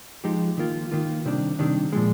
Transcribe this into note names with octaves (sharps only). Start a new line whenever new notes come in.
F3 G#3 D#4 G4
D#3 A#3 F4
D#3 A#3 F4
C3 D#3 G3 D4
C3 D#3 G3 D4
A#2 F3 G#3